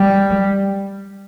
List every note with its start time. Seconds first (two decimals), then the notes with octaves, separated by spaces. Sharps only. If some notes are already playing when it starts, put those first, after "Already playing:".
Already playing: G3